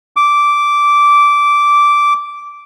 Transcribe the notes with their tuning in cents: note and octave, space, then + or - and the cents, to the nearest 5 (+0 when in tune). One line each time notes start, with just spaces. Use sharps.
D6 -10